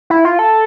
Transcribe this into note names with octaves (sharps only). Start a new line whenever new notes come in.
E4
F4
A4